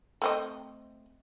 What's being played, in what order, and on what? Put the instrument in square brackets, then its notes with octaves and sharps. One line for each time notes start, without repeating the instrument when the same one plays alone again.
[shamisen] A3 C4 D#5